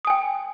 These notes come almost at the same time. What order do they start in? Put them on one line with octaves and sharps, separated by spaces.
D#6 G#5 G5